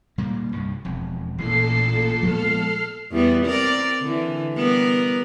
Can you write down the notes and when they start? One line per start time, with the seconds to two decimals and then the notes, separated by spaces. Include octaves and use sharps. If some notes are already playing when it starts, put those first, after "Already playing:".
0.18 A#2 G3 A#3
0.52 C2 G2
0.85 E1 F2
1.38 A1 A#2 E3 A#3 A4 C7
2.23 F3 G#3 B3 A4 F6
3.12 E2 G3 B3
3.46 C4 A#4 D5
4.01 D3 E3
4.56 G3 B3 A#4